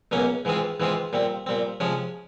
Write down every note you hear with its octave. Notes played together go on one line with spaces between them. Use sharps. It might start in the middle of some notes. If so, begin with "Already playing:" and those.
C#2 B2 F#3 A#3 C#4
G#2 E3 G#3 C4 F4
G#2 E3 G#3 C4 F4
A#2 G3 C4
A#2 G3 C4
C3 F3 G#3 C#4